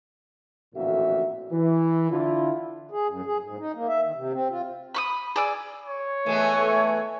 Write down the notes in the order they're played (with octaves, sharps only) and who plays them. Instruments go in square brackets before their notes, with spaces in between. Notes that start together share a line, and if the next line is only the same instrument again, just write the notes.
[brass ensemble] A1 F2 A#2 D3 F#4 E5
E3
D3 E4 F4
[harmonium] G#4
F#2
G#4
G#2
D#4
A#3
E5
D#3
C3
C4
F4
[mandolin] B5 C#6 D#6
G#4 D5 E6
[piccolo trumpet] C#5
[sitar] E3 G#3 B3 [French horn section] A3